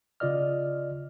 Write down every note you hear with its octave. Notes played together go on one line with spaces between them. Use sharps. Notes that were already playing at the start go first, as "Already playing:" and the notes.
C#3 F4 D5 D#5 F6